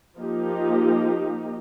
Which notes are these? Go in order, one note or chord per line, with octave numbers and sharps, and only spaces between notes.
F3 A#3 D#4 G4